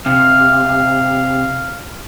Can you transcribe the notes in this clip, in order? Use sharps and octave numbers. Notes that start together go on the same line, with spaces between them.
C3 F5